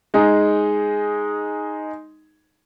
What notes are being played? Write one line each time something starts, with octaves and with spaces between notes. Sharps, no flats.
G#3 D#4 G#4